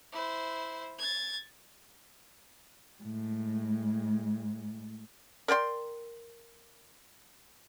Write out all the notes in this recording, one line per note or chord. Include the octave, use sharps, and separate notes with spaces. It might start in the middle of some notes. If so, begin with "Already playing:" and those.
E4 C5
G#6 A6
A2 G#3
A#4 D5 G5 C6